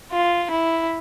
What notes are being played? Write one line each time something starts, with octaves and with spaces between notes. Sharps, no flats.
F4
E4